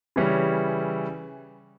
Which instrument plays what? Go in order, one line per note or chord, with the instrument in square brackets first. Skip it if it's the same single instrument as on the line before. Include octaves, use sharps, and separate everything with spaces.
[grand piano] C#3 E3 G3 C#4